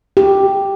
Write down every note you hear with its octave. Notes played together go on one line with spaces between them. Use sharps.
G4